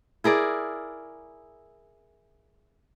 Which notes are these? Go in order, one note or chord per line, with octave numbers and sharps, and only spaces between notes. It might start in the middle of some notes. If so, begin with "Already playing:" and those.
E4 G#4 A#4 D5